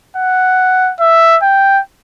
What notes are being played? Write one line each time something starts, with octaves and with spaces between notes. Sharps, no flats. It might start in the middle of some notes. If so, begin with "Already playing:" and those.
F#5
E5
G5